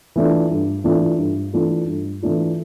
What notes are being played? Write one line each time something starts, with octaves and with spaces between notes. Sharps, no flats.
E3 A3 D4 F4
G2
E3 A3 D4 F4
G2
E3 A3 D4 F4
G2
E3 A3 D4 F4